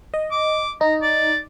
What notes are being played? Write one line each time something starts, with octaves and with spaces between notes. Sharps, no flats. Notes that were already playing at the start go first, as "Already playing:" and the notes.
D#5
D6
D#4 A#5
D5